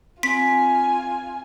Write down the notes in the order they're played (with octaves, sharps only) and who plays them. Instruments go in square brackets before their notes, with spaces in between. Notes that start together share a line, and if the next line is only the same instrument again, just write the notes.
[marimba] C4 [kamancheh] F4 G#5 [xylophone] B6